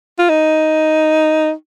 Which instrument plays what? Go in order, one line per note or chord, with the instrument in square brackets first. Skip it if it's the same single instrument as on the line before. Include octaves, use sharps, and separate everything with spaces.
[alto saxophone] F4
D#4